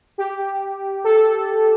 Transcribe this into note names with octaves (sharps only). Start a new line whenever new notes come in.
G4
A4